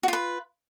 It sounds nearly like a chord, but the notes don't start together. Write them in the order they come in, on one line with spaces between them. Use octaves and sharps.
F#4 F4 B4